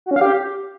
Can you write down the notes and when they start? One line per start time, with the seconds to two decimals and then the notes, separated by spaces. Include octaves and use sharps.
0.06 F#4
0.11 C#4
0.16 F5
0.21 G4